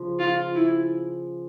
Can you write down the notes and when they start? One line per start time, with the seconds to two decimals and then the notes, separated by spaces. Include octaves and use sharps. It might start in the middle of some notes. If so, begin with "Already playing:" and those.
Already playing: C#3 F3
0.19 F4
0.55 E4